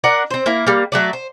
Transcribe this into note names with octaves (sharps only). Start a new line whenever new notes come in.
D4 A#4 F#5
C4 C5
A#3 E4
G3 A#3
F#3 A3 D5
C5